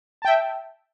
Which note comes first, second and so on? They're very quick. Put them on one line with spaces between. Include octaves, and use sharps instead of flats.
A5 G5 E5